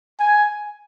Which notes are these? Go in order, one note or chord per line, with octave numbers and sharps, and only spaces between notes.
G#5